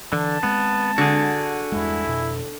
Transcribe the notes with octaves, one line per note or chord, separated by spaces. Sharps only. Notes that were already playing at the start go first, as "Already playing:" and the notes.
D3 E3 A5
G#3 B3 C4
D3 F#4 G#4
E2 G2 G#3 E4
F2 B2